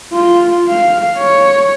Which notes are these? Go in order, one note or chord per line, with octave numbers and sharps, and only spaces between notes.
F4
F5
C#5